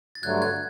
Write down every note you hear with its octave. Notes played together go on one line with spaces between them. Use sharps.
A6
G2 D3 F#3 A3 F#6 G#6
F#6 G#6